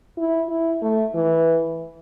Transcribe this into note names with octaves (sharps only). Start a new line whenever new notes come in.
E4
E4
A3
E3